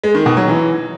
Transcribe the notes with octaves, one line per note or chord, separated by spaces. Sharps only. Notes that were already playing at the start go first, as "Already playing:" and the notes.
G#3
D#3
B2
F#3
E3